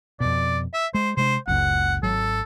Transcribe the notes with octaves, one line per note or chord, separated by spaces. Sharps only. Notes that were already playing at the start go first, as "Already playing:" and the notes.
F2 B2 D5
E5
G#3 C5
C3 G#3 D4 C5
F#1 C#2 F#5
G#1 F#3 A4